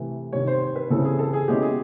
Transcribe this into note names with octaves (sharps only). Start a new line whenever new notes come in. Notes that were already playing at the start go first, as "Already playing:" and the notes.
Already playing: C3 E3 A3
C3 D#3 G3 C#5
C5
C5
B4
C#3 E3 G3 C4 E4 A4
G#4
A4
G#4
B2 G#3 C#4 E4 G4
G#4